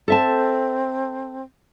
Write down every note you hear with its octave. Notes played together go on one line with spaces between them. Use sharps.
C4 A4 E5 A5